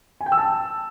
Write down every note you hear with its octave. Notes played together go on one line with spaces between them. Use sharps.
G#5
G5
E6
A5